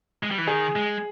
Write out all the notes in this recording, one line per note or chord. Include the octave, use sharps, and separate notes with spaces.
G#3
G3
E3
D#3 G#4
G#3